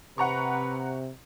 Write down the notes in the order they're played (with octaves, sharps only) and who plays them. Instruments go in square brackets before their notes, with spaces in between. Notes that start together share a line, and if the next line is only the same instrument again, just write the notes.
[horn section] C3 [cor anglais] B4 [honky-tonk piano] F#5 A#5 C#6